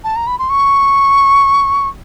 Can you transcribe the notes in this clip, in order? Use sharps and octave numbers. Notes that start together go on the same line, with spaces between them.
A5
A#5
B5
C6
C#6